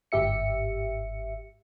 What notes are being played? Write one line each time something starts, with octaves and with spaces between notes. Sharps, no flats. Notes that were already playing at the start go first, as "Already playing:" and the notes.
G1 G#2 G4 E5 C#7